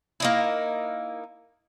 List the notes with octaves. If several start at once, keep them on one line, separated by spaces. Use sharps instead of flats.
A#3 D#4 E4